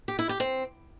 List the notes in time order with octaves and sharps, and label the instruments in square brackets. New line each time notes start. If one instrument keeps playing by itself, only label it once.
[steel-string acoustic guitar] G4
E4
G4
C4